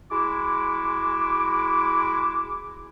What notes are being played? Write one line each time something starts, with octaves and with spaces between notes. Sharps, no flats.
G#3 E4 F#4 D6